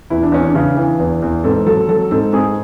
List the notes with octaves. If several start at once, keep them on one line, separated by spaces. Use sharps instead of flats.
E2 E4
D4
E2 C#4
D4
C#3
E3
E2
E2
G#2 A4
F#3 A4
F#3 A4
G#2 A4
G#2 G#4